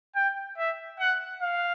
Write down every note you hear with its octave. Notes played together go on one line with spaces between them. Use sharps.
G5
E5
F#5
F5